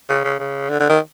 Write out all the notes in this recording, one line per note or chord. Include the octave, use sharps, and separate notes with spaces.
C#3
C#3
C#3
D3
D3
D#3